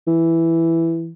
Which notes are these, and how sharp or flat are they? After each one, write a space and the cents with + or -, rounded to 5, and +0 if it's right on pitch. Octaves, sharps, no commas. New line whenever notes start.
E3 +5